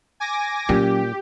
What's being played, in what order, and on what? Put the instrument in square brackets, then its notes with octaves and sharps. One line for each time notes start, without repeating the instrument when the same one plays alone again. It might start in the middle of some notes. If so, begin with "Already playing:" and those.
[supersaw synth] G#5 D6 A#6
[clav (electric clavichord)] A#2 [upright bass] F#3 C#4 [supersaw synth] G4